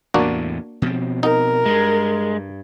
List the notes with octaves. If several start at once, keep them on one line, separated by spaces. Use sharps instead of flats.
E2 A2 C3 A#3 D4 F#4
B2 F3 C4
D#4 A#4
G2 G#3